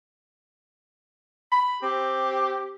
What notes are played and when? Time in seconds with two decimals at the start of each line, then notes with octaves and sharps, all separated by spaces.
1.52 B5
1.82 C4 G4